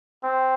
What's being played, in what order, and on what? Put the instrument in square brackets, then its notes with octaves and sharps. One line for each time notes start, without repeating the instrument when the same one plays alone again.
[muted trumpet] C4